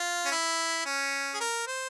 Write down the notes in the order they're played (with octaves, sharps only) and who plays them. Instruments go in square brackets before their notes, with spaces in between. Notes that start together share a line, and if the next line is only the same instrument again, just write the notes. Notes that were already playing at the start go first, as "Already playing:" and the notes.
Already playing: [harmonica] F4
C#4
E4
C#4
G#4
A#4
C5